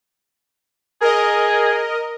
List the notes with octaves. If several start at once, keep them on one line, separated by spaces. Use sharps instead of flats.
G#4 A#4 D#5